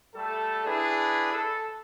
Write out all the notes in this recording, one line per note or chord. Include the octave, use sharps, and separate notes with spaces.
G3 A3 A4
D4 E4 G#4 B4
A4